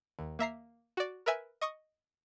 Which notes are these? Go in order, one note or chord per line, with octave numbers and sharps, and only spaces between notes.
D#2
A#3 E5 A#5 C7
F#4 D5
A#4 B4 E5 G#5 E6
D#5 C#6 D#6